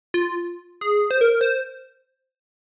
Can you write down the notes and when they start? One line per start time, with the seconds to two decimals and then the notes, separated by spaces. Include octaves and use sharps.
0.14 F4
0.81 G#4
1.11 C5
1.21 A#4
1.41 C5